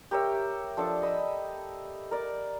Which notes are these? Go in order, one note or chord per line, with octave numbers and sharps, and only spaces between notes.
G4 A#4 C#5 E5
F3 D4 A4 D6
D#5 B5 E6
A#4 D5